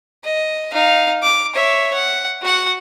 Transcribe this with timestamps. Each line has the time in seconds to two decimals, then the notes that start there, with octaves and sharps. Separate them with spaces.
0.24 D#5
0.73 D#4 F5
1.22 D6
1.54 C#5 E5
1.94 F#5
2.42 F#4 F#5